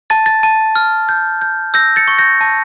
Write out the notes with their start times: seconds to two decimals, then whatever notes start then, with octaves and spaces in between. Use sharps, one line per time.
0.10 A5 A6
0.26 A6
0.43 A5
0.76 F6
1.09 G6
1.42 G6
1.74 E6 G6 A#6
1.96 A6 C#7
2.08 C#6
2.18 G6 A#6
2.41 A5